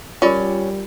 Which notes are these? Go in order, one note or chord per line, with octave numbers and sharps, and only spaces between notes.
G3 C#4 F4 A#4 D5